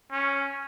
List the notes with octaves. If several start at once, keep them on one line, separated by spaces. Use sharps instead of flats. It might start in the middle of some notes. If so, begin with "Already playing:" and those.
C#4